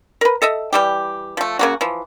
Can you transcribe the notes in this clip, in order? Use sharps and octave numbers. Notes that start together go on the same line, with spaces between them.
A#4 B4
A4 D#5 E5
E3 G3 G4
F3 A3
C#3 A#3 F#4
E3 F3